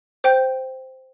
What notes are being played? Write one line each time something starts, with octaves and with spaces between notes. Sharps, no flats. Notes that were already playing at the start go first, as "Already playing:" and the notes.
C5 G5 G6